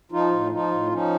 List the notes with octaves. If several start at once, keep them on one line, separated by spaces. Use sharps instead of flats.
F3 D#4 F4
A2
F3 D#4 F4
A2
F3 C#4 D#4